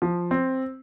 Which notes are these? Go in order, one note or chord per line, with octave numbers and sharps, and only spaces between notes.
F3
C4